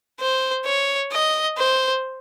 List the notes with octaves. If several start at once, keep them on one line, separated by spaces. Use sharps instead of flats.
C5
C#5
D#5
C5